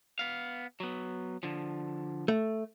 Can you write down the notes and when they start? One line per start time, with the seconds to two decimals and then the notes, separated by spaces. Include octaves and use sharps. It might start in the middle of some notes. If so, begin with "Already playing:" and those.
0.19 B3 F5
0.80 F#3 B3
1.43 D3 F3
2.28 A3